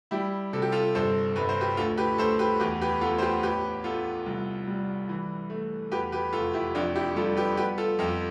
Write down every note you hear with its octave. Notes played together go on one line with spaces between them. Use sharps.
G3 E4 G4
C3 A4
G4
F4 A4
G1 A4 C5
G1 B4
C5
G4 B4
D2 F4 A4
G4 B4
D2 A4 C5
G4 B4
E2 G4 B4
G4 B4
B3 F4 A4
C5
G4 B4
A1 G4 B4
B3 F4 A4
C2
G3
E3
A3
E2 G4 B4
G4 B4
F1 F4 A4
E4 G4
F2 D4 F4
E4 G4
G3 F4 A4
G4 B4
B3 G4 B4
F4 A4
F2 F4 A4